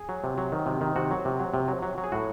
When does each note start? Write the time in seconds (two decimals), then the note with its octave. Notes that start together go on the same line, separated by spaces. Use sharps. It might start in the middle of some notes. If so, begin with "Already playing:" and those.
Already playing: G#4
0.09 F#3
0.24 C3
0.38 F#3
0.52 D#3
0.66 C3
0.81 D#3
0.96 C3 F#4
1.11 F#3
1.25 C3
1.40 F#3
1.54 C3
1.68 F#3
1.83 F#3
1.98 F#3
2.04 G#4
2.12 A2 F#4